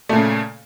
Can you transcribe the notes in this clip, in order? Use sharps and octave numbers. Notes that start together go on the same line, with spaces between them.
A#2 C#3 A3